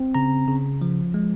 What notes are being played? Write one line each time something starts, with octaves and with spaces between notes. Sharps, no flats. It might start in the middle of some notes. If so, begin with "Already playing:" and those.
Already playing: C4
C#3 A#5
C#3
F3
G#3